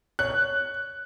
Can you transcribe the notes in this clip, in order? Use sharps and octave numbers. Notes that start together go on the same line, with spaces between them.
C#5 F#6